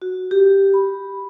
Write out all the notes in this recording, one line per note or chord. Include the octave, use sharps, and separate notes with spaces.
F#4
G4
B5